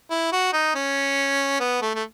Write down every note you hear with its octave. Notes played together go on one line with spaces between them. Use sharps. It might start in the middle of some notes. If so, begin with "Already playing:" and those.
E4
F#4
D#4
C#4
B3
A3
A3